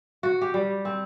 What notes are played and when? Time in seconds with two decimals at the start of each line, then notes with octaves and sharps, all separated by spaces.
0.23 F#4
0.41 G4
0.54 G3
0.85 C4